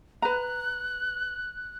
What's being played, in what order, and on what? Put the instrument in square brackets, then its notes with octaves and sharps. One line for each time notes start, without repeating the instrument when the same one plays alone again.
[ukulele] B4 A#5 [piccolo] F#6